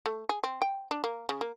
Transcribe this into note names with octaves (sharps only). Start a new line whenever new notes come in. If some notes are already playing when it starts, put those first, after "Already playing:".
A3
G#4
C4
G5
D4
A#3
C#3
A#3